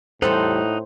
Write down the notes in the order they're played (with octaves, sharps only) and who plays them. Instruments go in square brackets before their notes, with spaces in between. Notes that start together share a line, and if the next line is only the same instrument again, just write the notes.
[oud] E2 G3 A4 [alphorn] A2 [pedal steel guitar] D#4 F#5 [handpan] C5